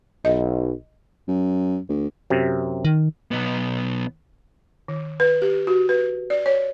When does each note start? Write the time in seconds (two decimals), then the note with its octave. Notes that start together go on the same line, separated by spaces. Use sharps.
0.25 B1 D#5
1.28 F#2
1.89 D2
2.30 F#2 C3
2.85 D#3
3.31 B1 B3
4.88 D#3
5.20 B4
5.42 G4
5.67 F#4
5.89 B4
6.30 D5
6.46 C#5